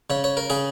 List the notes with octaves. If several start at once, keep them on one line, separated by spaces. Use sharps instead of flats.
C#3 C#5
C#5
A#4
C#3 G#4